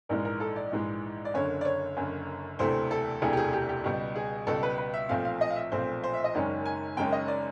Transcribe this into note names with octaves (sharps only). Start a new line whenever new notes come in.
A#1 G#2 E3 G#3 A#4
A#4
A4
D5
A#1 G#2 E3 G#3
D5
F#1 F#2 D3 C#5
D5
C#5
F#1 F#2 D3
E1 D2 C3 E3 A3 C5
A4
E1 D2 C3 E3 A3 G#4
G4
G#4
G4
G4
C#2 B2 G3 G4
G#4
C#2 B2 G3 A4
B4
B4
E5
B1 A#2 F3 A3 C4 F5
F5
D#5
F5
E5
B1 A#2 F3 A3 C4 C5
C5
E5
D#5
F#1 F#2 D#3 G#3 C#4 D5
G#5
F#1 F#2 D#3 G#3 C#4 G5
D#5
D5